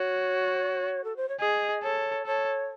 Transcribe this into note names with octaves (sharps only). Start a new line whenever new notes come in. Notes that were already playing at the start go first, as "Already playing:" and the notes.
Already playing: F#4 C#5
A4
C5
C#5
G#4 D#5
A4 C#5
A4 C#5